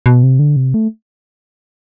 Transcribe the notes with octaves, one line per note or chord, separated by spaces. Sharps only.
B2
C3
D3
C3
A3